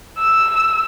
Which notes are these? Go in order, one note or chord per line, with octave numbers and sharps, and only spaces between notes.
E6